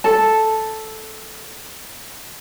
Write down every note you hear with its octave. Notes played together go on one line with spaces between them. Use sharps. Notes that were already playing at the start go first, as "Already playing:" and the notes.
A4 A5